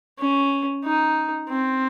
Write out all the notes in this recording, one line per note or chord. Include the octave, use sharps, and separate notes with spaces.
C#4
D#4
C4